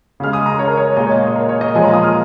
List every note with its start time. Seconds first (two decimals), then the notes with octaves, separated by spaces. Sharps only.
0.20 C#3 G#3 F6
0.33 D#6
0.46 A#5
0.59 C#5
0.68 A#4
0.77 C#5
0.97 A#2 G#3 D#5
1.07 C#5
1.17 D#5
1.36 A#4
1.49 C#5
1.61 D#5
1.75 A#2 F3 G#3 G#5
1.84 A#5
1.94 D#6
2.03 F6